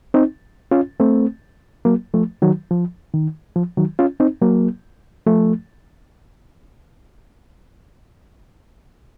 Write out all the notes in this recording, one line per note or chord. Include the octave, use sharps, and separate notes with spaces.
C4 D#4
C#4 F4
A3 C4
F#3 A#3
F3 A3
D#3 F#3
F3
D#3
F3
D#3 F#3
C#4 F4
C4 D#4
F#3 A#3
F3 A3